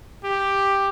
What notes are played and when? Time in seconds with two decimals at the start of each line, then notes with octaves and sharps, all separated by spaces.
0.24 G4